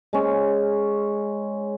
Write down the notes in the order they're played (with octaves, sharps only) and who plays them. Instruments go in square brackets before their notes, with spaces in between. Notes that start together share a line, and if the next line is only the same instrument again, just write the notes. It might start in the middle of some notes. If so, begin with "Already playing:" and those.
[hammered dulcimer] G#3 C#4